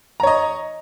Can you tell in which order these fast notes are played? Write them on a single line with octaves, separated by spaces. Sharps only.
A#5 C#5 D#5